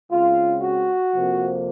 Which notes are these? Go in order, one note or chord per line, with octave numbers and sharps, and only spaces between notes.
C#3 G#3 C4 F4
F#4
F2 C3 F3 A#3